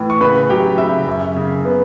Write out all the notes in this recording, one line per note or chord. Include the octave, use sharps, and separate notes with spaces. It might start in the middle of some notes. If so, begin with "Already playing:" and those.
Already playing: A2 E3
C#6
C#3 B4 B5
F#3 G4 G5
C#3 E5
F#2
C#3
B3